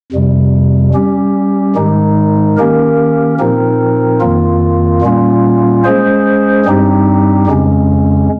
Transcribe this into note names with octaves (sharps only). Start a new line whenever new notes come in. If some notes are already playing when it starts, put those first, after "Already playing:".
F2 C3 G3
G3 C#4 G4
G#2 D#3 G#3 D#4
D#3 A#3 C#4 G4 A#4
A#2 F3 C4 D#4 A#4
F2 D#3 A#3 F4
A#2 G3 A#3 C#4 F4
G#3 C#4 G#4 C5
G2 G3 C4 D#4 G4
F2 C#3 G#3 C#4